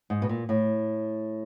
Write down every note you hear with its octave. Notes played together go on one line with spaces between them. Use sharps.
G#2
B2
A#2
A2